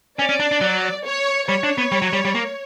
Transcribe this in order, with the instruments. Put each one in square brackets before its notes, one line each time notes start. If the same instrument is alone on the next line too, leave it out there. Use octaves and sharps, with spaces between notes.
[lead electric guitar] C#4 [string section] D5
[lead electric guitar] C#4
D4
D4
F#3
[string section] C#5
[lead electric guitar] G3 [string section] C#5
[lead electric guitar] D4
B3
G3
F#3
G3
G3
A#3